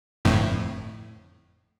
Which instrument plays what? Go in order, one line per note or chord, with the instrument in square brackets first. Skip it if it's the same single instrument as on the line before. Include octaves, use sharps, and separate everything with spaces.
[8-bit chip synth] G1 F2 A2